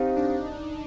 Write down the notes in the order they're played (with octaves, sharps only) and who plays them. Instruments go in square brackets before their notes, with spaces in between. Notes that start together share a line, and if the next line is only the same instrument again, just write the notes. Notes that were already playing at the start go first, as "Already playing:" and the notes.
Already playing: [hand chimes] C4 G4 C5 F5 [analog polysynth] D#4
[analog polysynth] D4